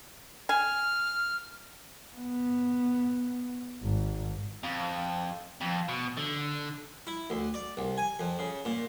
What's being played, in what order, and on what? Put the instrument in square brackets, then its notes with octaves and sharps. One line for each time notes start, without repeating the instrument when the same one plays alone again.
[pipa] G#5 [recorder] F6
[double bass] B3
G#1
[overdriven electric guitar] F2
F2
B2
D3
[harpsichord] E4
D2
D5
C2
G#5
F2
C#3
A#2